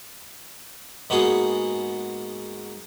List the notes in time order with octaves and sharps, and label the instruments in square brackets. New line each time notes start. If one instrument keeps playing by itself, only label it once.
[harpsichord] G#2 A#3 B3 F#4 G#4